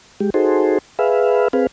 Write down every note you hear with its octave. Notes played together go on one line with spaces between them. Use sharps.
G#3 G4
D#4 F#4 G#4 A4 C5
G#4 B4 E5 F5
C4 G#4 B4 F5